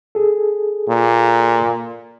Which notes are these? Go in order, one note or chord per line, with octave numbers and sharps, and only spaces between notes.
G#4 A4
A#2